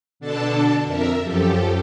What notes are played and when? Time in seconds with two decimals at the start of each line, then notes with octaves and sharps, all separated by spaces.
0.20 B2 D3 D4 A4 A5
0.84 F2 A#4 E5
1.22 F#2 F3 G4 A4